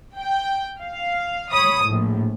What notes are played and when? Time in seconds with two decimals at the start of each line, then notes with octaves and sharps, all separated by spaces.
0.19 G5
0.81 F5
1.52 C#5 B5 D#6
1.85 A#1 A2